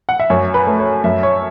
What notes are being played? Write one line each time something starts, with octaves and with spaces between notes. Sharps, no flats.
F#5
E5
F#2 C#5
B4
A3
C#5
F#2 E5
C#5